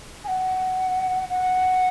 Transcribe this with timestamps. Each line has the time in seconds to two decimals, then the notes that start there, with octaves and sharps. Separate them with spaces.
0.24 G#5
0.28 F#5
1.29 F#5